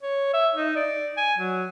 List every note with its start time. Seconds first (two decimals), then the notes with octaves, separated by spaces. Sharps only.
0.02 C#5
0.33 E5
0.55 D#4
0.76 D5
1.17 G#5
1.38 F#3